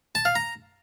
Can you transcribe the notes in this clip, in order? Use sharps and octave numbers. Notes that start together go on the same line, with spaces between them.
A5
F5
A#5